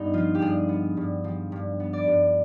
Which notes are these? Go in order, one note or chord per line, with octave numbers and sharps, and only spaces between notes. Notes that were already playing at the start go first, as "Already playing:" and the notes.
Already playing: G2 B3 D#4
F3 F4
G4
G2 G#4
B3
G2
F3
G2
B3
D5
G2